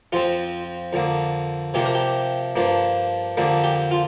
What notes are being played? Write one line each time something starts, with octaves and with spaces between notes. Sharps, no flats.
F2 F3 C4 F4
F2 D3 A#3 D4
C3 F3 A#3 D4 G4
A#4
G4
G2 F3 A#3 D4
F2 D3 G3 A#3 D4
G4
F4